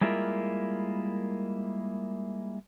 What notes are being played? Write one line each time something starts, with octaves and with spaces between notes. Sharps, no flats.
G3 G#3 A#3 E4 F4 A#4